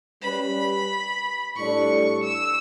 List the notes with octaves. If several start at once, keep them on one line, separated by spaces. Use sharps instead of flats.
G3 C#4 G4 B4 B5
A2 G3 D4 A4 C#6
E6